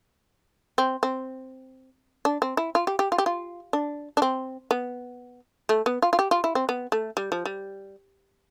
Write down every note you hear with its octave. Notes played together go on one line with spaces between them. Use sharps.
C4
C4
D4
C4
E4
F4
G4
G4
F4
G4
F4
D4
D4
C4
B3
A3
B3
F4
F4
G4
F4
E4
C4
B3
A3
G3
F3
G3